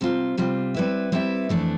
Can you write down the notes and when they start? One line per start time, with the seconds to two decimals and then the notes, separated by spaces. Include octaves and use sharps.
0.01 C3 G3 C4 F4
0.37 C3 G3 C4 F4
0.74 G3 C4 E4 B4 E5
1.12 G3 C4 E4 B4 E5
1.49 F2 E3 A3 D4